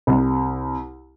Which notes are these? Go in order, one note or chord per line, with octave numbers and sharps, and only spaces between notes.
C2